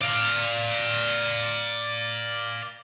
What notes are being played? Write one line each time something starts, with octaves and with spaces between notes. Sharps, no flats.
D5 F5